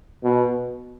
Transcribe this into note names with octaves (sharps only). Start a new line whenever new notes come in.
B2